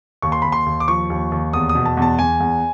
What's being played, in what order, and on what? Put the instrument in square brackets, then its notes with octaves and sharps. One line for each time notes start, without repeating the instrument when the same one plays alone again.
[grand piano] D#2 C#6
C6
D#2 B5
C6
D#2
D6
F3 C#6
D#2
D#2
E2 D#6
D#6
B2
A5
E2 A5
E2 G#5
E2